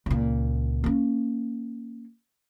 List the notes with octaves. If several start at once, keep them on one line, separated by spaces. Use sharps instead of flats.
C#2 A#2
A#3 C#4